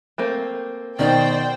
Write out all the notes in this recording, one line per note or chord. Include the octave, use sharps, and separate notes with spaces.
A3 A#3 C4
B2 D#3 C5 D5 G5